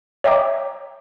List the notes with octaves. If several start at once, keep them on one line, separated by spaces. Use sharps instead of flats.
C#5 D#5 E5 G5 A#5 D6